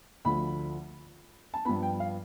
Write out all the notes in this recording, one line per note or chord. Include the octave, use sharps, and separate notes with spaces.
D2 D3 F3 B5
A5
G2 F3 B3 B5
G5
F5